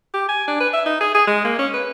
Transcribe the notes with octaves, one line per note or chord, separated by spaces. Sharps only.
G4
G#5
D4
B4
E5
D#4
G#4
G#4
G#3
A#3
C#4
B4